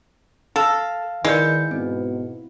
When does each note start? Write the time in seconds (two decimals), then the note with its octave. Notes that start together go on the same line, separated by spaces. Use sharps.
0.56 A4 F5 A#6
1.25 D#3 G#3 E4 B4 D5 G6 C#7
1.71 G#2 B2 B3 C4